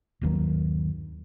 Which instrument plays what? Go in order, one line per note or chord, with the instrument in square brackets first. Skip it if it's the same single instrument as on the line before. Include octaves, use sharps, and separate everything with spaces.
[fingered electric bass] G1 D#2 D#3 F#3